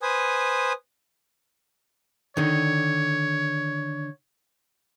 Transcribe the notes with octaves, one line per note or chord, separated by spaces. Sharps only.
B4 C5 G#5 D#6
D3 D#3 C#5